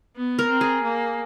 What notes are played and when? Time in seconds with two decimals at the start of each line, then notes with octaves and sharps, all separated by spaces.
0.16 B3
0.39 A#4
0.50 C4
0.61 G#4
0.83 A#3